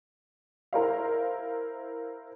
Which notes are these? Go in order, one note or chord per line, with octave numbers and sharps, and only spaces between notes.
E4 A#4 C5 F5